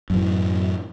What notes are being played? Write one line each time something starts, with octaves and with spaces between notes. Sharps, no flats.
F#2 A2 E3